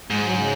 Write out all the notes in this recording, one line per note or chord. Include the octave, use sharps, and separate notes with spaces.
G#2 G#3
F#3
C#3